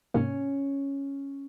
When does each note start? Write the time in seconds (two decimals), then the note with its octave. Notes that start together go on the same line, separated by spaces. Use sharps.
0.14 G#2 C3 A#3 C#4